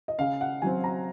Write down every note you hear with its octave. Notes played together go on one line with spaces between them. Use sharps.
D#5
C#3 F5
F#5
F#3 C4 G#5
A#5